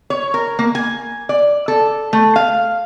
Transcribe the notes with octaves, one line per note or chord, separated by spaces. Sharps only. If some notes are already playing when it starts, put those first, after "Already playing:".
C#5
A#4
A#3
G#5
D5
A4
A3
F5